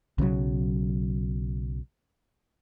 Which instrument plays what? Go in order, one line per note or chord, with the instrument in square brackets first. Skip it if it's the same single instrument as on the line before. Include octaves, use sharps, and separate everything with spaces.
[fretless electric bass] B1 C#3 F3 F#3